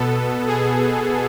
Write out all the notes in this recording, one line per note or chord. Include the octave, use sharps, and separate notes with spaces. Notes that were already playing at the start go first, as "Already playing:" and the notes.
Already playing: B2 B3 A4
G#4